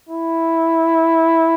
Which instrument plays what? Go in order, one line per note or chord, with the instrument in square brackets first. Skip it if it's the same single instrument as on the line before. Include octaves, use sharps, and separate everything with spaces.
[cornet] E4